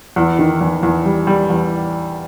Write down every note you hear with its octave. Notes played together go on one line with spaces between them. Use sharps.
E2
D#3
E2
E2
G3
G3
E2